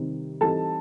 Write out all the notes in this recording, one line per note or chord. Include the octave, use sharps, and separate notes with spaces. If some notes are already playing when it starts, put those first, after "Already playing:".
Already playing: C3 D#3 G3 C4
E3 G3 C4 D#4 A4 A5